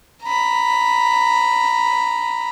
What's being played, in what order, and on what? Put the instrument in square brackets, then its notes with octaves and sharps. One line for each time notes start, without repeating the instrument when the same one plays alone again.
[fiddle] A#5 B5